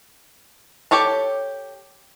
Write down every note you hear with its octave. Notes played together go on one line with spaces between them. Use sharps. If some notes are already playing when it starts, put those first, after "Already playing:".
G4 A4 C#5 A5